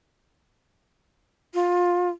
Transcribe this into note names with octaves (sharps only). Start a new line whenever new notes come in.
F4